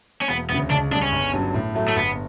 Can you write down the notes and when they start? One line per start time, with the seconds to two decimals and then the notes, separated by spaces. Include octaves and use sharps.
0.21 C#4
0.29 E1 B3
0.50 D2 C#3 B3
0.71 C#2 D4
0.91 C#3 D4
0.95 G3
1.02 C#4
1.12 G1
1.33 G2 F#3 C#4
1.54 A2
1.75 F#3 A3
1.88 A3
1.96 G1 B3